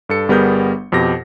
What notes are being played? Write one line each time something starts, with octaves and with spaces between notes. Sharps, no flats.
G2 A4 C#7
G1 G3 B3 G#4 A#4 G6
F2 B2 G4 A#6